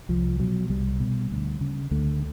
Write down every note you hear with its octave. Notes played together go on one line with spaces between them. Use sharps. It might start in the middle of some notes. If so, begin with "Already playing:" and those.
C2 F3
B2 F#3
C2 G3
B2
D2
C#3
D2 A3